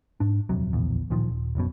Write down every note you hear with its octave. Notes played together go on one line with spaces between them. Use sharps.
G#2 D4
D#1 F2 C3 F#3
D1 A#1 E2
D1 A#2 D#3 F3
D#1
F1 B1 F#2 B2